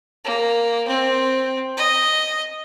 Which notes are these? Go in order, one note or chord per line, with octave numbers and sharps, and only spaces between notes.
A#3
C4
D#5